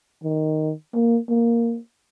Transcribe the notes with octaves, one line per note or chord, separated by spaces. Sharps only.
D#3
A#3
A#3